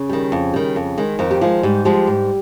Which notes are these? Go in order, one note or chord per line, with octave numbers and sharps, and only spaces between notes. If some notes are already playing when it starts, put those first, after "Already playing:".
Already playing: C#3 C#4
D#3 G3
F2
D#3 G3
F2
D#3 G#3
F2 D#3 D#4
G4
D#3 F3 G#3 F4
G#2 G3 G4
F3 G3 G#3 G4
G#2